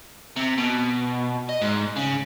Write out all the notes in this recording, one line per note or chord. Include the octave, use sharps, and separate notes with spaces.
C3
B2
D#5
G#2
C#3